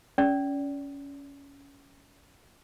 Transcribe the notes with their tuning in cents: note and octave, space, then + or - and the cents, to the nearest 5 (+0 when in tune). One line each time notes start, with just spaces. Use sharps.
C#4 +15 D5 -25